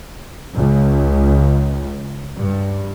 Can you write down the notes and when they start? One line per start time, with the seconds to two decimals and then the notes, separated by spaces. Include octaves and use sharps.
0.54 C#2
2.35 G2